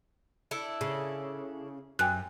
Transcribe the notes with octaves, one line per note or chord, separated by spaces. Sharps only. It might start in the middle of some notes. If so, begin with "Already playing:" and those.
D4 E4 A4
C#3
F#2 G5 G#5 F#6